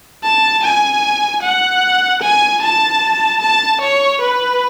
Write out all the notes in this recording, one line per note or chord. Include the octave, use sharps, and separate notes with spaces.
A5
G#5
F#5
G#5
A5
A5
C#5
B4